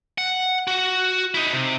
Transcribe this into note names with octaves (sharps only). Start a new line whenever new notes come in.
F#5
F#4 F#5
D#4 E4
C3